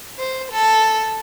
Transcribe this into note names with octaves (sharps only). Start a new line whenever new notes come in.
C5
A4